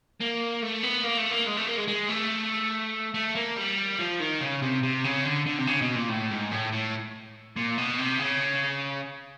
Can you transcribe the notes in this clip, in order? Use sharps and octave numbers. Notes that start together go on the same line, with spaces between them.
A#3
A3
B3
A#3
A3
A#3
G#3
A3
A#3
G#3
G#3
A3
A3
A#3
G3
F3
D#3
C#3
C3
C3
C#3
D3
D3
C3
C#3
B2
A#2
A2
G#2
A2
A2
A#2
B2
C3
C#3